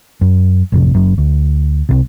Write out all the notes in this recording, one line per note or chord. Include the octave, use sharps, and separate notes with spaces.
F#2
A1 F2 C3
F#1 F#2
D2
C2 C3